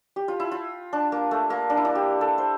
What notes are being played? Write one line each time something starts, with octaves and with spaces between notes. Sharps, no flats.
G4
F4
E4
F4
D4
A#3
A3
A#3
D4
E4
D4
G4
A4
C5